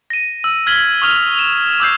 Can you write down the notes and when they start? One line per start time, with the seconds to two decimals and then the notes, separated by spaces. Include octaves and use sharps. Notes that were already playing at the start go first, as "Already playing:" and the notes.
0.10 A#6 D#7
0.44 E6
0.67 F6 G#6 B6 F#7 G7
1.02 C#6 D#6 F6 F7
1.35 E7 F7
1.80 D6 E6 G6 C7